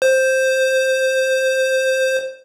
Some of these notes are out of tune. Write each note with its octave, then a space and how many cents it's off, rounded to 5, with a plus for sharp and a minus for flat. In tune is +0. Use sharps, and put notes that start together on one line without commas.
C5 +5